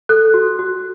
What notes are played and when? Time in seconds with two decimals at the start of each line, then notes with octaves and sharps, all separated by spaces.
0.09 A4 F#6
0.34 F#4
0.59 F#4